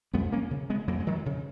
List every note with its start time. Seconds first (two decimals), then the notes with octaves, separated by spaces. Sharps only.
0.13 F2 G#3 B3
0.32 A#3 C#4
0.51 C#3
0.70 G#3 B3
0.88 F2 F#3 A#3
1.00 G#3
1.07 D#3 F#3
1.26 C#3